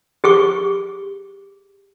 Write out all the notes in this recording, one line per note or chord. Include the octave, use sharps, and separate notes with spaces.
G4 G#4 C#6